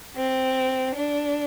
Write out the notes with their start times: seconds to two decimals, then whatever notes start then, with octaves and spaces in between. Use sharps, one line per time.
0.16 C4
0.96 D4